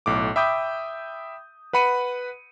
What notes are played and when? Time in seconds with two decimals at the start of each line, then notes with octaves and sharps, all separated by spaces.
0.06 B1 A2 D6
0.36 E5 G5 B5 D6 D#6 G6
1.73 B4 F#5 B5 C#7 D#7